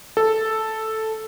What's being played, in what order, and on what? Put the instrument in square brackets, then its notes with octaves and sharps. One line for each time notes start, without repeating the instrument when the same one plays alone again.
[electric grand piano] A4